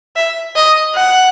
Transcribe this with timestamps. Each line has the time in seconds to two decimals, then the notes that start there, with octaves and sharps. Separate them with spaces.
0.16 E5
0.56 D#5
0.95 F#5